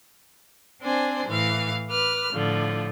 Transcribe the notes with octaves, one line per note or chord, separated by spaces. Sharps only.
C4 D4 C5 G#5
A2 E3 F5
B4 D6 F6
A2 D3 F3